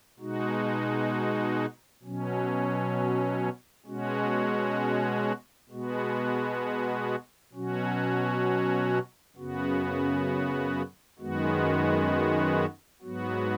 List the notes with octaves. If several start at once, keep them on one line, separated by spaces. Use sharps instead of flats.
B2 G#3 D#4 F#4
B2 F#3 C#4
B2 G#3 C#4 F#4
B2 G#3 B3 F#4
B2 F#3 C#4 F#4
F#2 C#3 B3 F#4
F#2 D#3 G#3 B3 F#4
G#2 F#3 B3 F#4